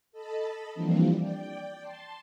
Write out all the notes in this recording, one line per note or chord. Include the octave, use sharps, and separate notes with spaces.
A4 D#5 A5 B5
E3 F3 G3 A#3 C4 D4
D5 G5
A5 C6